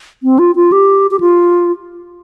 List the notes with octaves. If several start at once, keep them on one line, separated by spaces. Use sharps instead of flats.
C4
F4
F4
G4
G4
F4